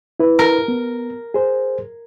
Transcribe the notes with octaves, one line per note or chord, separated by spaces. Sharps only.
E4 B4
A#4
B3
G#4 C5